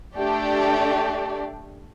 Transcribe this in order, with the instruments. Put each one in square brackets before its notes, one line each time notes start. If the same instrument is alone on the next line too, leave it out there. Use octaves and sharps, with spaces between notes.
[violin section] A3 D4 G4 D5